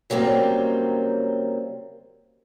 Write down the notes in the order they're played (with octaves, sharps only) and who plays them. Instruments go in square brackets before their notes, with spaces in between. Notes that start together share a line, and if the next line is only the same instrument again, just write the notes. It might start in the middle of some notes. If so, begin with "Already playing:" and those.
[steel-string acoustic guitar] C#3 F#3 G3 A#3 C4